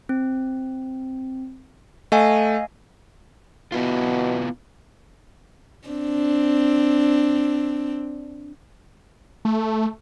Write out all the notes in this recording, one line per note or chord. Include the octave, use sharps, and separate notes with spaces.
C4
A3 D#5 F5 G#5
B2 B3 E4 F4
C4 D4
A3